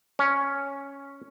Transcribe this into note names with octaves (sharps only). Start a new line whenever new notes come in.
C#4